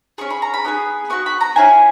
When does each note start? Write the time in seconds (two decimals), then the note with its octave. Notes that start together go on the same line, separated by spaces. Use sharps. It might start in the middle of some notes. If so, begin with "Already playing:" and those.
0.18 C#4 G#4 C#6
0.30 B5
0.42 A#5
0.54 B5
0.64 B3 D#4 G#4
1.10 B3 F#4 C#6
1.26 B5
1.41 A#5
1.56 C#4 E4 G#4 G#5